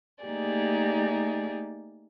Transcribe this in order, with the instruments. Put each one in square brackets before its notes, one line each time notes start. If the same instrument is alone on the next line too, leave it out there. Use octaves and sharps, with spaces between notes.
[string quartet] A3 A#3 D#4 G4 G#4 D5